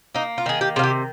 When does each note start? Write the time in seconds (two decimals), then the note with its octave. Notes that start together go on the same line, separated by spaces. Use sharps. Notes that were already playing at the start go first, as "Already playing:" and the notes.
0.14 A#3 D#4
0.38 F4
0.46 D#3 G#4
0.61 G4
0.76 C3 F4
0.83 G4